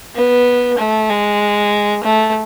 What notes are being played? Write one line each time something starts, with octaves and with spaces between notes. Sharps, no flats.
B3
A3
G#3
A3